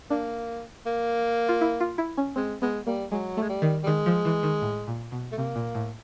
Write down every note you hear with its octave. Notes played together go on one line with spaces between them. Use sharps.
A#3 D4
A#3
F4
E4
F4
E4
C#4
G#3 C4
G#3 B3
G3 A#3
F#3 G#3
G#3 A3
G3
D#3
G3
D#3 G#3
F3
E3
D#3
A2
A#2
B2
A3
C3 A#3
A#2
A2